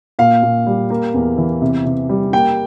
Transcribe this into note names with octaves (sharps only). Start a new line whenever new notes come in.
A#2 F5
A#2
G3
A#3
E2
E3
C3
C3
G3
A#3 G5